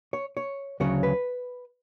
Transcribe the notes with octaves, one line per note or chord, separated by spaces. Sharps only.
C#5
C#5
D2 C#3 F#3 C#5
B4